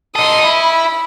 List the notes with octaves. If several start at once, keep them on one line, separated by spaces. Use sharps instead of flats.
D#4 A4 C6 D#6
E4 B5